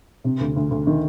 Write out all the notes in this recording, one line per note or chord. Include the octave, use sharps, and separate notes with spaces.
C3
D2
D2
D2
D#3